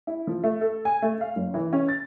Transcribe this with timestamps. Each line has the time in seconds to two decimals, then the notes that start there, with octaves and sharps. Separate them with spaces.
0.07 E4
0.27 F3
0.44 A3
0.61 A4
0.85 G#5
1.02 A3
1.21 F5
1.36 F#1
1.54 E3
1.73 C#4
1.88 A6